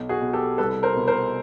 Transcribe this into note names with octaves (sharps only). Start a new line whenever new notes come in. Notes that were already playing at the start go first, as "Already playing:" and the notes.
Already playing: B1
F#4 G#4
B2
G4 A4
C2 A4 B4
A#4 C5
B2
A#4 C5